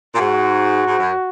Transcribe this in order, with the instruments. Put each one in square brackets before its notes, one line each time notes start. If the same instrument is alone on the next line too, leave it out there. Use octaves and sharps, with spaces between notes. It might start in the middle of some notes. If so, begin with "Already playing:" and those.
[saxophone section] A#2
[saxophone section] G#2 [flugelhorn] F#4
[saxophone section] G#2
F#2